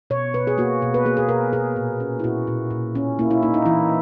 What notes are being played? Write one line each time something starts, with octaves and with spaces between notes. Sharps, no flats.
B2 C#5
B2 B4
G#4
A#3 F#4
B2
B4
A#3 G#4
G#4
B2 A#4
B2 G#4
A#2
C#4
E4
A#2 F#4
A#2
A#2
C#4
A#3 E4
E4
A#3 D#4
D#4
E3 E4